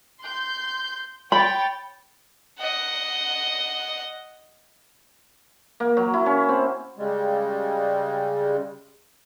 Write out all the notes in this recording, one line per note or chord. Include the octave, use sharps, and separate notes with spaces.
C6 G6
C#5 G5 B5 A6
D#5 F#5
A#3
F#3
E4
C#4
C4
C#3 G3 G#3